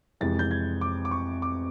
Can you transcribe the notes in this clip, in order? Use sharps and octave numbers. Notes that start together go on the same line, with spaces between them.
F2 C3 E3 G#3 A6
G6
G#6
D6
D6
C#6
D6